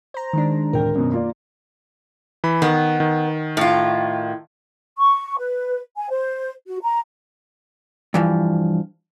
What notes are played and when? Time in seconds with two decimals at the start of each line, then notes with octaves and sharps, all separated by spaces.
0.14 C5 A#5
0.33 D#3 G#3 D4
0.73 D1 A#4 G5
0.95 F#2 B2
1.12 A#3 F4 D5
2.44 E3 B5
2.62 D#3 B3
3.00 D#3
3.57 A2 F4
4.98 C#6
5.38 B4
5.97 G#5
6.10 C5
6.67 F#4
6.82 A#5
8.14 G2 E3 F3